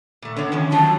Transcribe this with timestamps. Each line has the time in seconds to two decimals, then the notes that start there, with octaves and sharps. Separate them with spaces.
0.22 A#2 A3
0.36 D3 B3 C#5
0.52 D#3 F3 C#4
0.72 D#3 F3 F#3 A5